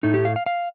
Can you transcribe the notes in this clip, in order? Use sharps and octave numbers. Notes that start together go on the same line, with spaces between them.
A2 A3 D#4
G4
F5
F5
F5